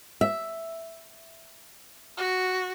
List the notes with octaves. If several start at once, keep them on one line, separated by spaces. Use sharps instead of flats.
E5
F#4